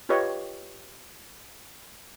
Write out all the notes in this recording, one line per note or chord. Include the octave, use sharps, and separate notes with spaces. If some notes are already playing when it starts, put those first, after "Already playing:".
F4 G4 B4 C#5 D#5 F5